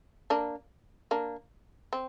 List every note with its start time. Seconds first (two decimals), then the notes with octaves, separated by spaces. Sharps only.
0.30 A#3 D4
1.11 A#3 D4
1.93 C4